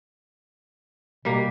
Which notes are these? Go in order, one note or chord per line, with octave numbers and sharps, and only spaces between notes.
B2 G3 A#3